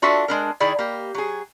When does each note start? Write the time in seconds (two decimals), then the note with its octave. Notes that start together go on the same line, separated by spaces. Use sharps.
0.02 D4 F4 F#4 A4 E5
0.28 G#3 D4 A#4
0.60 D#3 E4 G#4 D5
0.79 A#3 G4
1.14 F#3 G#4